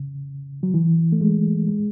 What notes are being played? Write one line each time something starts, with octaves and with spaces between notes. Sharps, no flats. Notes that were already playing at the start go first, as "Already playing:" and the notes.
Already playing: C#3
F#3
E3
A3
G#3
G#3